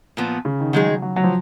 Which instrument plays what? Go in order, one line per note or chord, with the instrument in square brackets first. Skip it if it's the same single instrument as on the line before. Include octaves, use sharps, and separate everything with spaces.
[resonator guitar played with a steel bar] A#2 F3 B3
[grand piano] C#3
D#3
[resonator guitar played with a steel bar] D#3 G#3 D#4 G#4 [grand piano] F#3
[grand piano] F#3
F#3
F#3
F3